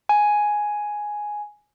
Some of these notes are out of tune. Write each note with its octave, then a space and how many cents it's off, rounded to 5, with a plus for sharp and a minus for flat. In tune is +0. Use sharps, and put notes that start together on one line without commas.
G#5 +5